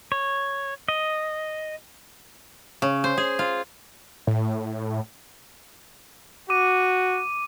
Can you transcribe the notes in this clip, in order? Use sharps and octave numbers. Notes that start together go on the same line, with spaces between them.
C#5
D#5
C#3
C5
G#4
F4
A2
F#4 D6 D#7